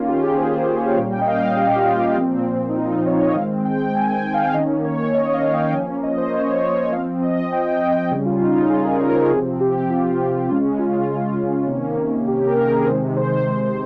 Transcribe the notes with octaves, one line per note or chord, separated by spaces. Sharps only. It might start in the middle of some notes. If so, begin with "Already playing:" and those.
Already playing: D#3 A#3 C#4 F4
G4
G#4
C5
C#5
F5
A#2 G3 A#3 C#4 G5
G5
D#5
F5
D#5
G4
F4
G4
A#2 F3 C4
D#4
F4
F4
C#5
D#5
D#3 G#3 C4 F5
G5
G#5
G5
F5
D#3 A#3 C#4 D#5
C#5
D#5
F5
G5
F3 A#3 C#4 G#5
D#5
C5
C#5
C5
C#5
C#5
F3 C4 F5
D#5
G5
G5
C#3 G3 C#4 G#4
F4
D#4
F4
G#4
A#4
C#5
A#4
C5
A#4
C3 F3 C4 G#4
G4
F4
C#3 G#3 C#4 F4
F4
F4
C3 D#3 A#3 C#4
G4
A#4
G#4
C3 D#3 G#3 C5
C5